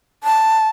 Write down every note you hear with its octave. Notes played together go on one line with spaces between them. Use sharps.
A5